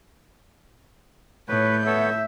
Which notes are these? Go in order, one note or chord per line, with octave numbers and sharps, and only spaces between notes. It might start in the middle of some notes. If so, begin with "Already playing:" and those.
A2 B4 C#5 G6
B3 A4 C#5 E5